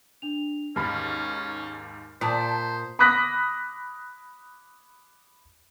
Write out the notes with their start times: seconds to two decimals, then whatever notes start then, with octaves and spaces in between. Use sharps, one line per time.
0.22 D4 F7
0.76 D#2 G#2 C#4 B5 F6
2.21 A#2 C5 A5 D#6 B6
2.99 B5 D6 D#6 F#6 A#6 B6